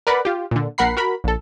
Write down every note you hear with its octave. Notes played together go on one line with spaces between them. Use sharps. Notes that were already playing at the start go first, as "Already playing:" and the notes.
A#4 B4 D5 F#5 B5
F4 G4
A#2 D3
A#1 A#4 F#5 B5 C7
F#4 A#4 B5
A#1 A4